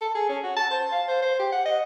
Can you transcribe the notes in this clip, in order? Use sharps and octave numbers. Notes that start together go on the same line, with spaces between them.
A4
G#4
C#4
F#4
A5
C5
F5
C5
C5
G4
F#5
D#5